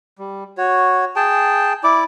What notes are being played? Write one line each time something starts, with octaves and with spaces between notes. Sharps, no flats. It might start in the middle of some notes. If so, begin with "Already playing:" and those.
G3
F#4 C#5
G#4 G5 A5
E4 D5 D6